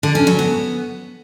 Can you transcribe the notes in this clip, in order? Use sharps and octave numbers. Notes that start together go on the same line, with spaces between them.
D3
C#4
F#3
B3